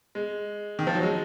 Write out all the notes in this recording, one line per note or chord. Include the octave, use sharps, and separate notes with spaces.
G#3
D#3
F3
F#3
G#3